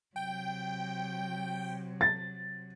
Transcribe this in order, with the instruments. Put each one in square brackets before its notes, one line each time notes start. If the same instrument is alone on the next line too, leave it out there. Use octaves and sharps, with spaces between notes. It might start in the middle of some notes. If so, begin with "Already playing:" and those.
[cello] C3 F#3 [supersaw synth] G5
[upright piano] A6